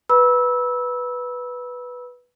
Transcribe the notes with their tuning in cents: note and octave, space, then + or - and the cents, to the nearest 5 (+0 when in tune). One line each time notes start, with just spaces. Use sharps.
B4 -5 B5 -30 E6 -15